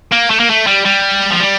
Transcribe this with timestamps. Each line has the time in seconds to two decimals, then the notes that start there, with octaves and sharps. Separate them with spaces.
0.12 A#3
0.30 A3
0.40 A#3
0.50 A3
0.67 G3
0.85 G3
1.31 F3
1.40 G3